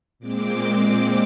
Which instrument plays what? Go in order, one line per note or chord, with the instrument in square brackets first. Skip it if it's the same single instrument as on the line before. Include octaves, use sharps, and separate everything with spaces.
[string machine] A#2 G#3 C4 D6